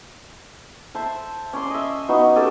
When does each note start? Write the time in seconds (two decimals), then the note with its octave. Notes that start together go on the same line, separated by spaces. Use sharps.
0.95 C5 E5 A5
1.53 C#4 D5 C6
1.70 D#5 E5
2.08 B3 D#4 F#4
2.36 C#4 G4 A4